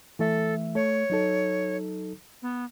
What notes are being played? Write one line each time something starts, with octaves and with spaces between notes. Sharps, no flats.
E3 A3 A4 E5
A3 C#5
F#3 D#4 A4
B3